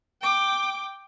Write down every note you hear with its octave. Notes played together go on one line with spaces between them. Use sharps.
G5 D6